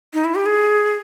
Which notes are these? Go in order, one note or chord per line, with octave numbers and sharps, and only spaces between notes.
D#4
E4
G4
G#4